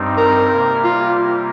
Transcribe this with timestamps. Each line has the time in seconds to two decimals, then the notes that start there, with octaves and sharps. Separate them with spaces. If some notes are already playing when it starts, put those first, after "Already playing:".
Already playing: G2 G3 C4 D#4
0.17 A#4
0.51 C3 G3 A#3
0.84 F4